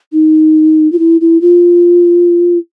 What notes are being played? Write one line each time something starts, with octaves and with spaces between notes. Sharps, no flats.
D#4
F4
E4
E4
F4